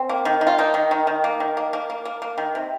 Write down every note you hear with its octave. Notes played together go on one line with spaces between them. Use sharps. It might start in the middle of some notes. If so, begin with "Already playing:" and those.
Already playing: C4
A#3
D#3
D#3
F4
A#3 D#4
D#3
D#3
D#3
A#3
D#3
A#3
A#3
A#3
A#3
A#3
D#3
C3